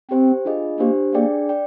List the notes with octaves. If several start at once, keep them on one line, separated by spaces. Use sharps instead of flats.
C4 G4 C5 G5
D4 F4 G#4 D#5
A#3 D4 G4 C5
A#3 D4 G#4 D5 G5
D5 G5